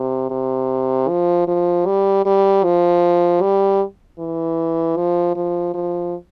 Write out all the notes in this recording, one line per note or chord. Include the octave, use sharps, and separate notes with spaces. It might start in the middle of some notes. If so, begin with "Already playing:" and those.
Already playing: C3
C3
F3
F3
G3
G3
F3
G3
E3
F3
F3
F3